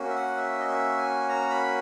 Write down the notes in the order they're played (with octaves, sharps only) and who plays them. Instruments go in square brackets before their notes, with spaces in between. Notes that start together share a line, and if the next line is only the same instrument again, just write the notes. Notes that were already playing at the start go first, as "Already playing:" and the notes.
Already playing: [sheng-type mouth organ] A#3 C#4 F#4
E5
F#5
E5
D#5
E5
G#5
A#5
B5